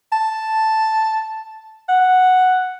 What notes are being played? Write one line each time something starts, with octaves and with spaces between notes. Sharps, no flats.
A5
F#5